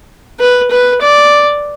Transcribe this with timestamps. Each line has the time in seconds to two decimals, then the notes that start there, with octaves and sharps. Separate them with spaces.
0.40 B4
0.71 B4
1.02 D5